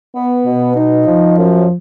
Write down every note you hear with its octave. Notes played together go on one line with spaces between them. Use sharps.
B3
B2
D#4
F3
F#2